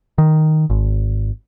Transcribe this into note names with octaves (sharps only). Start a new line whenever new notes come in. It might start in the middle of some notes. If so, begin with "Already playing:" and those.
D#3
G#1